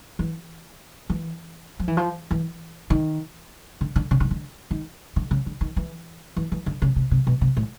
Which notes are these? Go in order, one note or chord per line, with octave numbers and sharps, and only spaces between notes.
E3
E3
F3
E3
F3
E3
D#3
D3
D3
C#3
D3
D3
D#3
D3
C#3
D3
D#3
E3
E3
E3
D3
C#3
C3
C3
B2
C3
A2